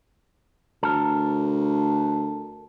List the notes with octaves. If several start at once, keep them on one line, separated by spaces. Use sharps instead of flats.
D2 A4 A#4